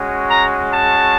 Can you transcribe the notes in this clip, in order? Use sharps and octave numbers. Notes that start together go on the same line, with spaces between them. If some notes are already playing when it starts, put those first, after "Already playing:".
Already playing: G#3 C#4 F#4
A#5
A5